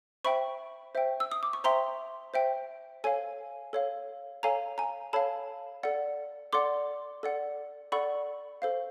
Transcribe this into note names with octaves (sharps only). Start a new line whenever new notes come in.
C5 E5 G5 B5 C#6
C5 E5 G5
E6
D#6
D6
C#6
C5 E5 G5 A#5 C6
C5 E5 G5
A4 C#5 F5 G#5
A4 C#5 F5
A4 C#5 F5 G#5 A#5
G#5 A#5
A4 C#5 F5 A5 B5
A4 D5 F#5
A4 D5 F#5 C6 D6
A4 D5 F#5
A4 D5 F#5 B5 C#6
A4 C5 F5